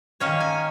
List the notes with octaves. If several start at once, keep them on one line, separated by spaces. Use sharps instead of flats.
D#3 A#3 C#4 C#5
G#5